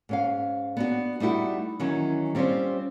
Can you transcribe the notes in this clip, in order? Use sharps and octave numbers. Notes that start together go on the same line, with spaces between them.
G#2 C#4 F5
B3 D4 F#4
G3 A3 D#4 E4 F#4
D#3 E3 F#3 C#4 E4
G3 C4 C#4 F4 C5